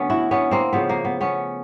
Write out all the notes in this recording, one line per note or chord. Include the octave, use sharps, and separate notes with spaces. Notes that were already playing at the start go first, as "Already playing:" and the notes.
Already playing: D3 F#3 A3 B3 C#4
E4 F#4
B3 C#4
A#3 C4
C#3 F3 A3 B3
A#3
B3
B3 C#4